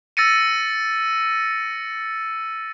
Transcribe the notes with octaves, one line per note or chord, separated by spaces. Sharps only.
E6 A6 A#6 C#7 D#7